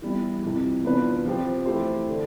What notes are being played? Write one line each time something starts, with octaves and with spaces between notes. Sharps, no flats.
E3 G3 B3 E4
F2 C3 E3
E3 B3 D4 F4 B4
F3 C4 G4 C5
E3 A3 E4 G4 C5
D3